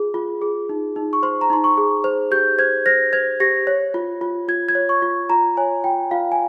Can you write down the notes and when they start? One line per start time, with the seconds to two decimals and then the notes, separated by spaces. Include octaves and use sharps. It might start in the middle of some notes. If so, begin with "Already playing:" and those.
Already playing: F4 G#4
0.14 F4
0.42 G#4
0.69 D#4
0.96 D#4
1.13 C#6
1.23 C5 C6
1.41 A#5
1.50 D#4 C6
1.64 C#6
1.77 G#4
2.04 C5
2.31 G4 G6
2.58 C5 G#6
2.86 C5 A#6
3.13 C5 G#6
3.40 G4 A#6
3.67 C#5
3.94 F4
4.21 F4
4.48 F4 G#6
4.69 G#6
4.75 C#5
4.89 C#6
5.02 F4
5.30 F4 A#5
5.57 C#5 G#5
5.84 F4 G5
6.11 F4 F5
6.32 G#5